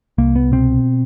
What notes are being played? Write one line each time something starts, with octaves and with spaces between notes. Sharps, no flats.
C2 A#3
B3
B2 C4